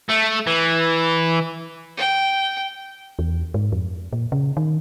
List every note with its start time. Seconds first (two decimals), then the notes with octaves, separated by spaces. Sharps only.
0.09 A3
0.47 E3
1.97 G5
3.19 E2
3.54 G#2
3.72 F2
4.13 A#2
4.32 C#3
4.57 D#3